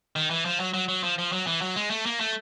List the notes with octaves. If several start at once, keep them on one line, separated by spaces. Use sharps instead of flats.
D#3
E3
F3
F#3
F#3
F#3
F3
F3
F#3
E3
F#3
G#3
A3
A#3
A3